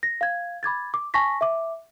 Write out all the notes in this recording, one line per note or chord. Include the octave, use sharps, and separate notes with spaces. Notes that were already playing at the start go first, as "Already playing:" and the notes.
A#6
F5 G#6
B5 D6 G#6 A6
D6
G#5 A5 C#6 A#6 B6
E5 D6